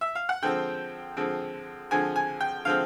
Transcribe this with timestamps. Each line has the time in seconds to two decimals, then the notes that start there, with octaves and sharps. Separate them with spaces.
0.01 E5
0.15 F5
0.29 F#5
0.43 D3 F3 G#3 C4 G5
1.17 D3 F3 G#3 C4
1.91 D3 F3 G#3 C4 G#5
2.16 G#5
2.41 G5
2.65 D3 F3 G#3 C4 F5